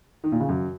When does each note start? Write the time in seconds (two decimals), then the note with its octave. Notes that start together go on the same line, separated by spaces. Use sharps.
0.24 D#3
0.32 A#2
0.40 C#3
0.49 F#2